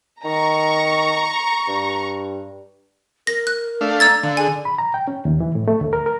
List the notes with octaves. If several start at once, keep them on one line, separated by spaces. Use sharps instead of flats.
D#3 A#5 C#6
G2
A#4 A#6
F#6
A3 D4 F5
A#5 E6 G#6 A6
D3 F5
G#4 G#5
B5
A#5
G5
C#4
D#2
E3
A2
A3
D2
A#4
A#4